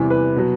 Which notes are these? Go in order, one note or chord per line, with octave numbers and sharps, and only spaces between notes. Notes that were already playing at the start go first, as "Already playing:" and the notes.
Already playing: E2 C3 E3 G3
B4
B2 F#3